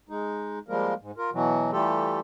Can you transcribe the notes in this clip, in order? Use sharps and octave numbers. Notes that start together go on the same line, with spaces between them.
G#3 D#4
F3 G3 G#3 A#3 A#4
G#2
F4 A#4
B2 E3 F#3
E3 G3 A3 F4 G4 A4